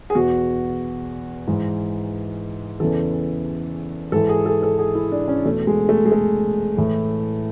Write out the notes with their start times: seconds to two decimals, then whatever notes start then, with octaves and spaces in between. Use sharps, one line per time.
0.10 G#4
0.15 E2 B2 F#4
1.47 G#2 E3
2.80 E2 C#3 E3 A4
4.12 G#2 E3 A4
4.29 G#4
4.46 A4
4.63 A4
4.79 G#4
4.95 E4
5.12 D4
5.28 C#4
5.45 E2 B2 A3
5.67 G#3
5.89 A3
6.06 G#3
6.12 A3
6.77 A2 E3